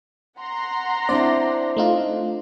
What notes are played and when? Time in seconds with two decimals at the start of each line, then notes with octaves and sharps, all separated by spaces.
0.39 F#5 A#5 C6
1.09 C4 D4 E4 D5
1.77 A3 D#4 F4